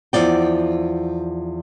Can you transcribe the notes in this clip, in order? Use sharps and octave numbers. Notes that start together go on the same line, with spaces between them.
E2 F3 D5 G5